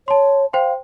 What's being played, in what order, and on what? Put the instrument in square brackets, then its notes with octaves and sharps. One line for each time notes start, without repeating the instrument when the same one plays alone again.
[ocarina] C#5 [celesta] A5 C6
[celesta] C5 G5 C6 [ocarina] F5